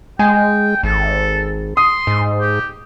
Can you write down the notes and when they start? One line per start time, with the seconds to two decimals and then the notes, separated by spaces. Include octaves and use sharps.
0.19 G#3 G5 G#5
0.83 G#1 A4
1.77 C6 D#6
2.07 G#2
2.41 G4